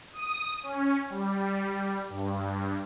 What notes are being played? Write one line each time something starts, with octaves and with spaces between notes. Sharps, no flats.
D#6
C#4
G3
G2